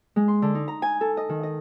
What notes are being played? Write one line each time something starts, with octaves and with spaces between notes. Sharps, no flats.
G#3
C6
D3
D#4
A#5
G#5
A4
D#5
D#3
D#5